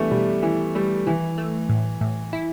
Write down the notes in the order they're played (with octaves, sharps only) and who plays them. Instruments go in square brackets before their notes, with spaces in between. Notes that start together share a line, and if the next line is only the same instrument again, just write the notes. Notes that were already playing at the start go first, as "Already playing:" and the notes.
Already playing: [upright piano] E3 G3 A3 B3 D4
[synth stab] B2 [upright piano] G3
[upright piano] E3 [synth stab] E4
[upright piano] G3 [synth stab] A3
[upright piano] E3 [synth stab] E4
[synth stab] A3
A2
A2
E4